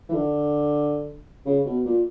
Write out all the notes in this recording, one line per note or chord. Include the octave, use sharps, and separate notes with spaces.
E3
D3
C#3
B2
A#2